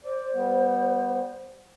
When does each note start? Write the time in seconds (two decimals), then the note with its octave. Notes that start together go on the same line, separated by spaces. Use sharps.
0.04 C5 D5
0.34 G3 B3